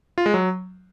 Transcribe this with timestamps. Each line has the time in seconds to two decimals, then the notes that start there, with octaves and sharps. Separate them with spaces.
0.18 F4
0.26 G#3
0.34 F#3